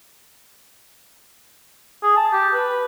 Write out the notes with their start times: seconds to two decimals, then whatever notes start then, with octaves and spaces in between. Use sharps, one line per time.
2.03 G#4
2.17 A5
2.33 G4
2.54 B4